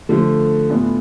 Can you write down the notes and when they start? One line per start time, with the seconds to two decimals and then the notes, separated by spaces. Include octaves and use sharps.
0.09 D3 F3 A3
0.70 A2 E3 B3 D4 F4